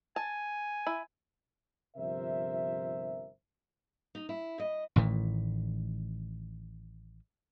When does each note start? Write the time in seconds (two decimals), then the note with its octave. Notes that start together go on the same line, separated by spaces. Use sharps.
0.16 G#5 A5
0.87 E4
1.97 G1 C3 F3 A#4 C5 E5
4.15 D#4
4.29 E4
4.59 D#5
4.96 A1 A2 D#3 E3